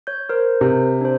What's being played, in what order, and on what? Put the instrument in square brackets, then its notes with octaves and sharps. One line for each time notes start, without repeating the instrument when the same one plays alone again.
[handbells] C#5 G6
A#4 C5
[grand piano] C3
[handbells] D4 C5